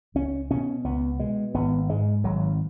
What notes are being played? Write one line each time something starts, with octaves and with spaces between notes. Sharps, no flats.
C#2 C#4
B2 C#4
C#2 B3
B2 G#3
G#1 B3
G#2 G#3
G#1 F#3